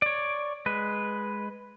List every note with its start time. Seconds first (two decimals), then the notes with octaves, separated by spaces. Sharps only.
0.02 C#5 D5
0.66 G#3 B4